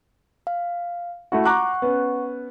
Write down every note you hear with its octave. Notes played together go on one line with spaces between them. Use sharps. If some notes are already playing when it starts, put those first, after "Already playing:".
F5
A3 E4 F#4
F#5 A#5 C#6 D6 F#6
B3 C#4